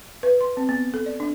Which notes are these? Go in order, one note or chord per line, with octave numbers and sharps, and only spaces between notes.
B4
C6
C4
B3
A4
D5
D4